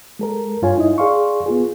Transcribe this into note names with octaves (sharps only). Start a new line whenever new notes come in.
G#3 A4 A#4
G2 F4 C#5 G#5
D#4 E4 D#5
G#4 D5 F5 C6 C#6
B3 F4 G#4